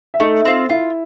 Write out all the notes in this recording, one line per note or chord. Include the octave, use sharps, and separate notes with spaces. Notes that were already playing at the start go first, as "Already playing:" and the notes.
E5
A3 D#4 D#5
C4 F4
E4 F4 E5